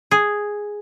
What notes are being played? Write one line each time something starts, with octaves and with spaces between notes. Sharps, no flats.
G#4